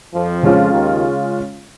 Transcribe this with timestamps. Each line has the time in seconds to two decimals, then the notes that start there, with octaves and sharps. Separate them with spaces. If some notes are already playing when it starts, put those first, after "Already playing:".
0.14 F2 F3
0.43 C#3 G#3 C#4 F4
0.72 D#2 D#3